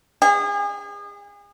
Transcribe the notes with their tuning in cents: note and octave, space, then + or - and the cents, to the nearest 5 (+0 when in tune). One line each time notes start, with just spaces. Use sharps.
G#4 -35